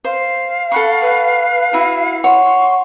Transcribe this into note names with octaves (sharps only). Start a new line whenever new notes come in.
C5 F5
A4 F#5 B5 C#6
B4
E4 F#4 B4 E5
C#5 F#5 C6 C#6